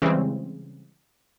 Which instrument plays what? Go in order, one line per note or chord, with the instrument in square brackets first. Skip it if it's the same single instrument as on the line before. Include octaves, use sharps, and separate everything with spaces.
[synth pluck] C#3 E3 G3 G#3 C4